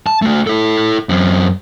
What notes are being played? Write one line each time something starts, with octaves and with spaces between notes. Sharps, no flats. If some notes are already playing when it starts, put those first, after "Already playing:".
A5
A3 F#4
E4 A4
F#2 C4